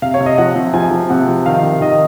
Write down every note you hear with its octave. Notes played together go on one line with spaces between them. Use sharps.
C3 F5
C#5
C3
D#5
F3 F#5
C3
F3 G#5
F3
C3 F#5
F3
D#3 F5
C3
D#3 D#5